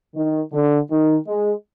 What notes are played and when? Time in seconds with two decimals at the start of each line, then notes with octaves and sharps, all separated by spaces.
0.15 D#3
0.53 D3
0.90 D#3
1.27 G#3